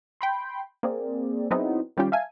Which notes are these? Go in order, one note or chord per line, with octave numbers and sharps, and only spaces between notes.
G5 B5 C6
A#3 C4 G#4 D5
F#3 B3 C4 D#4 E4 G#4
D#3 G3 C#4 F4 G4
E5 F5 G#5 A5